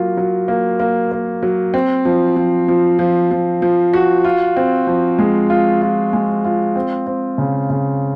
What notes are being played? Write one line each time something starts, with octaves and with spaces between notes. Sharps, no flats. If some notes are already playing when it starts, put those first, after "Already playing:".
Already playing: F#3 A#3 F4
F#3
A#3
A#3
A#3
F#3
C4
F3
F3
F3
F3
F3
F3
F#4
F4
C4
F3
G#3
F4
F4
G#3
F4
C4
C4
C#3
C#3